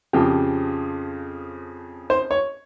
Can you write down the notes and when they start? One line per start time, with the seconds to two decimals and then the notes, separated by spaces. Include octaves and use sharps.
0.13 F2 C#3 F3 G4
2.10 C5
2.31 C#5